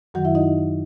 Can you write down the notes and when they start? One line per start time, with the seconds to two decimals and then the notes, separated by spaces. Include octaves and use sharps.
0.14 F#2 D#3 F#3 F#4 F#5
0.25 E4 E5
0.35 D#4 D#5